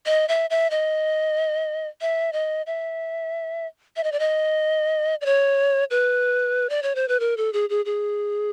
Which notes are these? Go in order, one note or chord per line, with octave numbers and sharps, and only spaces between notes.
D#5
E5
E5
D#5
E5
D#5
E5
E5
D#5
D5
D#5
D5
C#5
B4
D5
C#5
C5
B4
A#4
A4
G#4
G#4
G#4